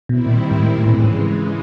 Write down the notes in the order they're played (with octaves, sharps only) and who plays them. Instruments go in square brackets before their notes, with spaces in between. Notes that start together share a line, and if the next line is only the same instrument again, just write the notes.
[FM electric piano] B2 [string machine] D#3 G3 C4 E4
[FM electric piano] A#2
G#2
A2
[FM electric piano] A2 [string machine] C#3 E3 G#3
[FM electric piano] A#2
A2
G#2